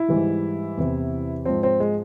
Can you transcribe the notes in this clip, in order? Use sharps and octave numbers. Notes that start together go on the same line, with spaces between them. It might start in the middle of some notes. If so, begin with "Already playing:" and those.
Already playing: E4
G#2 E3 G3
E2 C3 E3
G#2 F3 C4
C4
G#3